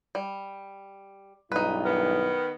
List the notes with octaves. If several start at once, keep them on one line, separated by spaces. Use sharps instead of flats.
G3
B1 G2 D#4 E4 B4
D#3 B3